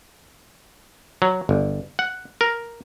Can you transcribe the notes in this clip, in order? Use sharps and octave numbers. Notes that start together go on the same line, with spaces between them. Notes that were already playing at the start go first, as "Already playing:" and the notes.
F#3
G1
F#5
A#4